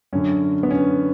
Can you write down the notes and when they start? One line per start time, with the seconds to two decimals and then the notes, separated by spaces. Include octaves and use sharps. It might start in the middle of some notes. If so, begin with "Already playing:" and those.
0.13 F#2 D3 C#4
0.63 B3
0.71 C#4